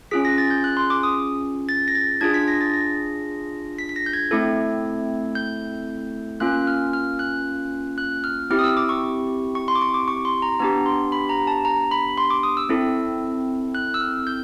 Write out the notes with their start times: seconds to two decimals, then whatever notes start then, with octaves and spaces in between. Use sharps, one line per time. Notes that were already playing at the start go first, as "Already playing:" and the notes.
0.11 C#4 F4 G#4 B6
0.25 A#6
0.38 A6
0.51 G6
0.64 F#6
0.77 C6
0.90 D6
1.03 D#6
1.69 A6
1.88 A#6
1.95 A6
2.21 D4 F4 G#4 G#6
2.34 B6
2.48 A#6
2.61 A6
2.73 A#6
3.78 B6
3.89 B6
3.96 A#6
4.06 G6
4.13 G#6
4.31 A3 C4 E4 A4
5.35 G6
6.40 A#3 C#4 F4 F#6
6.67 F6
6.93 F6
7.19 F#6
7.98 F#6
8.24 F6
8.51 C4 E4 G4 F6
8.59 D#6
8.64 E6
8.77 D6
8.89 C#6
9.55 C#6
9.68 C6
9.75 D6
9.82 C#6
9.94 D6
10.08 C#6
10.25 C6
10.42 A#5
10.60 B3 D4 G4 A#5
10.86 C6
11.12 B5
11.29 A#5
11.47 A5
11.65 A#5
11.91 B5
12.17 C6
12.30 D6
12.43 D#6
12.57 E6
12.69 C4 E4 A4
13.75 F#6
13.94 E6
14.01 F6
14.27 G6